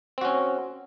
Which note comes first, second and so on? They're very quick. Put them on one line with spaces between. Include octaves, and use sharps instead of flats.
C4 F#4 C#4